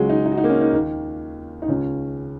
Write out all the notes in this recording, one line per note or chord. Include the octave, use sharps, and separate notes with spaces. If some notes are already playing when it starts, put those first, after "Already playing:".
Already playing: C#2 C#3 F#3 G#3
D#4
D#4
F#4
D#4
A#3
C#4
D#4
D#2 D#3
D#4
C#2 C#3 C#4